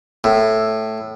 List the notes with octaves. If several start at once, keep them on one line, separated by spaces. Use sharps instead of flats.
A2